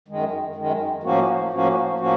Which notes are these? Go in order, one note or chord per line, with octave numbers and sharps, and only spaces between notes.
F#2 D#3 G#3
F#2 D#3 G#3
A2 F3 A#3 C#4 F#4
A2 F3 A#3 C#4 F#4
A2 F3 A#3 C#4 F#4